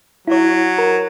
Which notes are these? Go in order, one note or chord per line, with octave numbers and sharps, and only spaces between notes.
F#3 E4 C#5
A#4